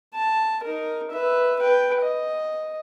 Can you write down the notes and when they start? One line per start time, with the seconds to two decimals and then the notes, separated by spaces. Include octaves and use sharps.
0.14 A5
0.63 D#4 A#4
1.12 B4 E5
1.59 B4 G5
2.02 D#5